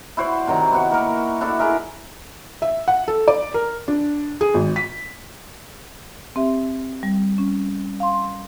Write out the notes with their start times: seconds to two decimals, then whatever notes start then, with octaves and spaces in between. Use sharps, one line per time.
0.17 E4 F#4 C5 D5
0.47 C3 D#3 F#3 A#5
0.71 B3 E4 F#4 F#5
0.91 A#3 A#4
1.41 D4 E4 F#4 A4
1.59 E4 G#4 A#4 E5
2.62 E5
2.88 F#5
3.08 A4
3.28 D5
3.54 A#4
3.88 D4
4.41 G#4
4.54 G#1
4.76 B6
6.36 C4 G4 E5
7.03 G3
7.38 C#4
8.00 F5 C6